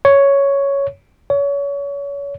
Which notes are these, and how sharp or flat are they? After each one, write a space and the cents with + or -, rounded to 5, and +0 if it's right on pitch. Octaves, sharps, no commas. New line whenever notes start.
C#5 +5
C#5 +30